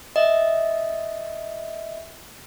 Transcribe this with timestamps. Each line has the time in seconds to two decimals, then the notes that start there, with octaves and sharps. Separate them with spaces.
0.16 D#5 E5